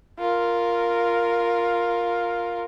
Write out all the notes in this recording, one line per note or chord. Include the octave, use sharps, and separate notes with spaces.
F4 A#4